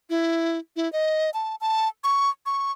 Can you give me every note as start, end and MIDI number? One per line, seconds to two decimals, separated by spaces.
0.10 0.58 64
0.76 0.91 64
0.93 1.30 75
1.34 1.55 81
1.61 1.88 81
2.04 2.30 85
2.46 2.72 85